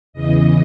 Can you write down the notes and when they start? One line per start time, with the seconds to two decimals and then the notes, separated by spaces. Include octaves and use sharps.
0.13 E2 C#3 E3 D#5